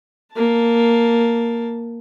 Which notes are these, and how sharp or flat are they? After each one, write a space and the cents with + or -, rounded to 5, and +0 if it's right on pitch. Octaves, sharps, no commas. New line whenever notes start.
A#3 +0 A5 +0